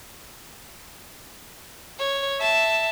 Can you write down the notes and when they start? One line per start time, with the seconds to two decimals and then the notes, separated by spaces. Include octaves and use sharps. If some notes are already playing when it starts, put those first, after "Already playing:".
1.99 C#5
2.39 E5 A5